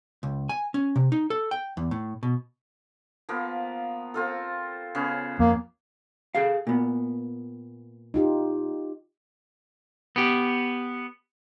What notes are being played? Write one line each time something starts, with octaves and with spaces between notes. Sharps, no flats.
C#2
G#5
C#4
C3
D#4
A4
G5
E2
A2
B2
F3 A#3 B3
C4 F4 A4
C#3 B3 C#4
F2 A#3
G#4 A4 F5
A#2 B3
D#4 F4 G4
B3 G4